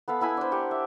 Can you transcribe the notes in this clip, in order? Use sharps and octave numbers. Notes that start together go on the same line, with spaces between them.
B3 A4 F5 B5
B3 E4 G#5 B5
D4 C5
G4 A#4 F#5
E5